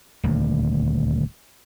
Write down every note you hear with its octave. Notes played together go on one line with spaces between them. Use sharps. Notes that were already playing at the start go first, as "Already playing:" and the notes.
D#1 D2